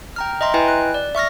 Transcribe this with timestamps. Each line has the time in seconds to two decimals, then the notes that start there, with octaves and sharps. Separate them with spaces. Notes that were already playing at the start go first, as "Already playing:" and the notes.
0.16 G5 A#5 F6
0.41 D#5 E5 A#5 C6
0.54 E4 B4 D#5 G5 G#5
0.68 F#6
0.94 D5
1.15 E5 C#6 F6 A#6